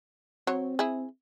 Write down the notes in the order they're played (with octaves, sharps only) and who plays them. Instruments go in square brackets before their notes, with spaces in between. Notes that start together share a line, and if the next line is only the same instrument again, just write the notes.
[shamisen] F#3 C#5 [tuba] C4
[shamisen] E4 G#4